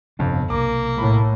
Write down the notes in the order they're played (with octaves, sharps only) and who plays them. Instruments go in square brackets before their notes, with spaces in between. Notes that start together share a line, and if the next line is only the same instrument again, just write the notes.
[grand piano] G1 F2 [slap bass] C3 B3 D4
[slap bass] B1 C3 [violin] A#3 [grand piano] D6
[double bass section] A2 [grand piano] B5